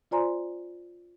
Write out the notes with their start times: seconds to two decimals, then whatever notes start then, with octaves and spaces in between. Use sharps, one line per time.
0.11 F4 C5 D5 G#5 A#5 C6